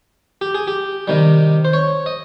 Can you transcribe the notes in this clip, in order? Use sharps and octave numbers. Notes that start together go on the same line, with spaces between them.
G4
G#4
G4
C3 D#3 G3
C5
C#5
D#5